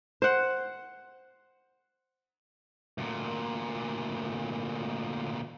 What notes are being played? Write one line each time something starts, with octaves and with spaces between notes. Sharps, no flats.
C5 F#5
D2 A#2